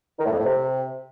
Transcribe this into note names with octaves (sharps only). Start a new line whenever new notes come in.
D#3
A2
F2
A2
C3